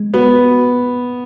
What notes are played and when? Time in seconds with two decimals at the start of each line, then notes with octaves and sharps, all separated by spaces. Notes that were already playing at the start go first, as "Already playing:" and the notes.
Already playing: G#3
0.14 B3 F#4